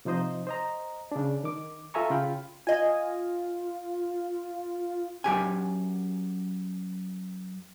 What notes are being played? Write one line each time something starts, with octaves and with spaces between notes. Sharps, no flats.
C3 F3 D#4 C5 D#5
C5 D#5 A#5
C#3 D4
D#3 D6
F4 A4 E5 G#5 A#5 C#6
C#3 F4 G5 B5
F4 D#5 G#5
F#2 G4 G#5